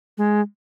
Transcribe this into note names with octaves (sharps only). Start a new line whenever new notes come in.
G#3